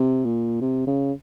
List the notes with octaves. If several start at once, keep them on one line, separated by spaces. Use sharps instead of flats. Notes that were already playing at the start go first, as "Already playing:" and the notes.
Already playing: C3
A#2
C3
C#3